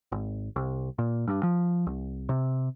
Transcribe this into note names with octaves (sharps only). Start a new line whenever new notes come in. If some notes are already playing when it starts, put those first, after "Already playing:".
G#1
C2
A#2
G2
F3
C2
C3